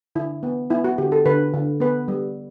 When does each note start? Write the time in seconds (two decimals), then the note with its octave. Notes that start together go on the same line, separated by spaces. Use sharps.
0.15 D3 E4
0.43 B3
0.70 B3 E4
0.84 F#4
0.98 D3 G4
1.12 A4
1.25 D3 B4
1.54 D3
1.80 B3 B4
2.08 G3